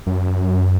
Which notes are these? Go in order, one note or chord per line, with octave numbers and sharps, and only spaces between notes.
F#2